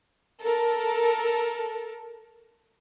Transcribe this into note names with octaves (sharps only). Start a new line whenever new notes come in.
A4 A#4